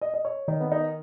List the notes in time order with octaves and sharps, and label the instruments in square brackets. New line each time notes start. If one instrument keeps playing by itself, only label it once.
[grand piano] D#5
D#5
C#5
[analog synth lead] D#3 [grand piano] D#4
[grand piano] B3
D#4